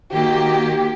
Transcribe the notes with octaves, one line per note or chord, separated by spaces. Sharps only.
D#3 A#3 F#4 G4